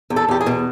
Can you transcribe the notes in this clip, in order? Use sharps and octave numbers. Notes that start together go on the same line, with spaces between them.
E2
A4
E2 G4
G#4
B2